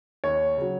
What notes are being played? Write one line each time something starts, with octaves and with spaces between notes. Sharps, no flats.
D#2 C#5
C#3 F#3